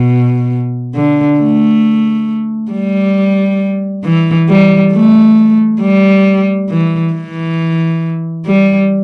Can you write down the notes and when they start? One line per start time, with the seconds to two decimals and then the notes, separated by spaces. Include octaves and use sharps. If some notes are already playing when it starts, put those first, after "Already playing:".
Already playing: B2
0.95 D3
1.40 A3
2.72 G3
4.04 E3
4.49 G3
4.92 A3
5.81 G3
6.70 E3
7.14 E3
8.46 G3